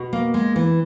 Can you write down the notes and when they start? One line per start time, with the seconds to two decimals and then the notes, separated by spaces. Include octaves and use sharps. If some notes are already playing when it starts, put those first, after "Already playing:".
Already playing: B2
0.13 A#3
0.34 G#3
0.56 E3